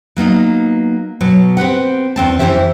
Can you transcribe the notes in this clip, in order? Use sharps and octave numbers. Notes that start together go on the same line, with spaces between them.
F#3 A#3 B3 D#4
B2 F#3
C4 G4 B4 F#5
E2 C4 A5
F2 D#3 E3 G4 C5 E5